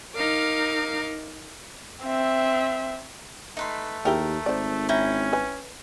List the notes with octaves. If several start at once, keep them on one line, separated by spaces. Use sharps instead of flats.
D#4 A#4 F5 D6
C4 E5
A3 D#4 B4 C6
D#2 E4 G4 G#4 A#4
G#1 C5 D5
C#4 E4 G5 A#5
B4 G#5